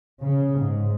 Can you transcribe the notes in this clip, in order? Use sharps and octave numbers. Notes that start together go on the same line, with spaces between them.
C#3
G#2